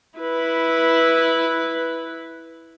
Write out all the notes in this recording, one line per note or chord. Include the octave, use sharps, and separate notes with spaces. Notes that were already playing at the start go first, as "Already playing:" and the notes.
E4 B4